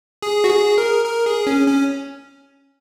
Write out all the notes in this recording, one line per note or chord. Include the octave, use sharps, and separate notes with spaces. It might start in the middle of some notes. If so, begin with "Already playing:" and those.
G#4
F#4
G#4
A#4
A#4
G#4
C#4
C#4